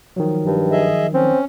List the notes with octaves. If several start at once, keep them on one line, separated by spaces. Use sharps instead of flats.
D#3 F3 F#3
G2
G#4 D#5 E5
C4 C#4